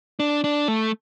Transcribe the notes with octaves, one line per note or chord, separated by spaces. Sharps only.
D4
D4
A3